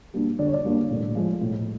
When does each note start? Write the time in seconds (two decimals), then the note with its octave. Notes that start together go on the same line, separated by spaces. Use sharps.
0.14 G3 A#3 D4
0.39 D3 D5
0.47 C#5
0.53 D5
0.64 G3 A#3 D4
0.90 A2
1.15 F3 G#3
1.41 A2